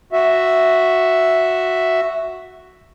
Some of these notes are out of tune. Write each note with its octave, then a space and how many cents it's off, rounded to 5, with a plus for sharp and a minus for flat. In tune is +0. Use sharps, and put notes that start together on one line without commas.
F#4 +0 E5 +0